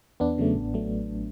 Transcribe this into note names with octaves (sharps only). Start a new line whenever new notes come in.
E2 B3 D4
C#3 F#3 A3
A1
F#3 A3